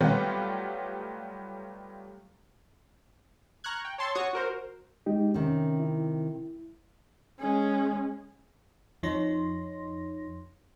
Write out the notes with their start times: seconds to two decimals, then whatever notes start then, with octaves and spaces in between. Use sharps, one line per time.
0.01 F#3 G3 A3 B3 F4 G4
3.64 A#5 C#6 F6 F#6 G#6
3.85 G5
3.98 C#5 A5 C6 C#6 E6 A6
4.15 F#4 C#5 C#6 D#6
4.33 F#4 A#4 C5
5.06 G#3 D#4 G4
5.34 C3 D#3 C#4
5.80 E4
7.40 G#3 C#4
9.03 F2 F3 D#4 C#5 C6 A#6